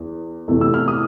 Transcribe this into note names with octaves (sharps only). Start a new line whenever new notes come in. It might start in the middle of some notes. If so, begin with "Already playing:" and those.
Already playing: E2
E2 C3 E3 A3
E6
F6
D#6